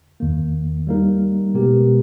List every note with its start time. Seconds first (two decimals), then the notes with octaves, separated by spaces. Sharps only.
0.20 E2 D#3 A#3
0.87 G3 A#3 D#4 A#4
1.54 B2 G#3 B3 G4 A#4